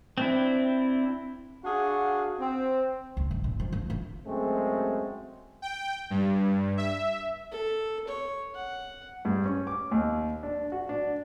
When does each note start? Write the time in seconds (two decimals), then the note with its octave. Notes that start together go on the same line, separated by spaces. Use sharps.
0.18 C4 D4 E4
1.64 D4 F#4 G#4 F5 F#5
2.40 C4
3.17 C#2
3.31 G1
3.44 A#2
3.60 F3
3.72 F3
3.90 F4
4.26 F#2 G#3 A3 C4
5.62 G5
6.10 G2
6.77 E5
7.52 A4
8.08 C#5
8.55 F#5
9.25 G2
9.45 C#4
9.67 D6
9.91 D#2
10.43 D4
10.72 F#4
10.89 D4